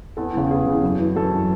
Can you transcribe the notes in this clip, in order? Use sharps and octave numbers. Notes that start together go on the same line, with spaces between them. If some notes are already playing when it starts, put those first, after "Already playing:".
E2 A4
C#3 E3
E2 G#4
C#3 E3
F#2
E3
F#2 A4
E3